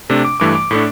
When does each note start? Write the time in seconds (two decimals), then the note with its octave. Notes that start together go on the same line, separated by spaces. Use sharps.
0.10 C3 A3 D4
0.25 D6
0.40 G2 E3 A3 D6
0.55 D6
0.71 A2 A3 D4